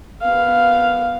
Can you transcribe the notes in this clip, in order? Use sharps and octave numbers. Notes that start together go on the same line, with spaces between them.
B3 F5